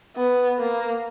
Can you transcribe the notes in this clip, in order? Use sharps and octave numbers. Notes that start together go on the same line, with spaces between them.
B3
A#3